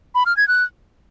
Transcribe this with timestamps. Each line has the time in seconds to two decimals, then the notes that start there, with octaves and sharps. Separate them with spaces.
0.15 B5
0.26 F6
0.37 G#6
0.48 F#6